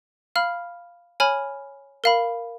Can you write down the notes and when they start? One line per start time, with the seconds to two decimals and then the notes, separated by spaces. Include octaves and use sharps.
0.36 F5 B5 F6
1.20 C#5 G#5 B5 F6
2.04 A#4 F5 B5